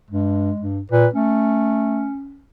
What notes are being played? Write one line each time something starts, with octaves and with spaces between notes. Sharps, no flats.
G2 G#3
G2
A#2 B4
A3 C#4